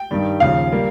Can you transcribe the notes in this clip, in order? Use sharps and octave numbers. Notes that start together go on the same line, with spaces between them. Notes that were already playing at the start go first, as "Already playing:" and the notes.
Already playing: G5
G2 D#3 G3
D#2 C#3 F3 F5
G3 A#3